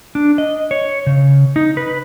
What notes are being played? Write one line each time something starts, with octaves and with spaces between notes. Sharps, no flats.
D4
D#5
C#5
C#3
D#4
B4